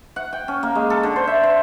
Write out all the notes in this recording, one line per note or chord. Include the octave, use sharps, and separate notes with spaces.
F#5
G5
C#4
A#3
G#3
A4
D3
C5
E5
C5